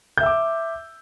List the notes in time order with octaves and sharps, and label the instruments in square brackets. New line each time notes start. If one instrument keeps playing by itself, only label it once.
[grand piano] G6
E5
E6
D6